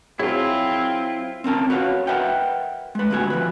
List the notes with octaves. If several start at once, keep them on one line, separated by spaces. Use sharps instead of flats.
F#3 C4 E4 F4 G#4 A#4
C4 C#4 A#4 A5
F#4 B4 C#5 F5
A#4 B4 E5 F#5 G5
G#3 B4
D2 G2 A#2 B3 F#4 G#5
F3 B4